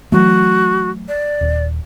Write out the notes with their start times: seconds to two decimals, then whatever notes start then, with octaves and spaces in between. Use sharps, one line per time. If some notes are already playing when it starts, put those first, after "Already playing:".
0.12 E3 F#3 A3 F#4
1.08 D5
1.41 D#1